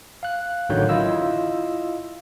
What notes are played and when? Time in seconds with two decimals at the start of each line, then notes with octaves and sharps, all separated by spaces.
0.23 F5 F#6
0.69 A1 D3 D#3 F#3 C#5 G6
0.89 E4 F4 D#5 F5 E6